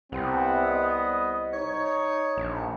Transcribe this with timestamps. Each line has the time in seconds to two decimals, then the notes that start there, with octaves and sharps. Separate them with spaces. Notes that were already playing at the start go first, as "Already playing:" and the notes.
0.12 C2 G3 B3 C4
0.66 D#5
1.53 D#4 C#5
2.37 A#1